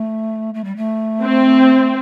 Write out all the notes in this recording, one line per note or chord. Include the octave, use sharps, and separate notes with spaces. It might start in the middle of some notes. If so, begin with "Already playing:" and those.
Already playing: A3
A3
G3
A3
C4